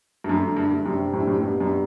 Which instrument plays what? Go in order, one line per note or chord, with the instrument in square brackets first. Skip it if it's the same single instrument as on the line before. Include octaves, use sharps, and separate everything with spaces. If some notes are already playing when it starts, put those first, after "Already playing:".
[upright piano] G2
[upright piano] F#2 [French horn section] D3 A3 D4
[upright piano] F#2
G2
G2
[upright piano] F#2 [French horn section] C3 G3 D4 G4
[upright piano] G2
F#2 A2
F#2 A2
[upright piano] G2 [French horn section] B2 G3 B3 D4 G4
[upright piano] F#2